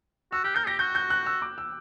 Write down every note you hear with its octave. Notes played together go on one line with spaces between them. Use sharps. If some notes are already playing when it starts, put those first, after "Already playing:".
F#4 E6
G4 F#6
A#4 G6
G4 A#6
F#4 G6
G6
F#6
E6
D6
E6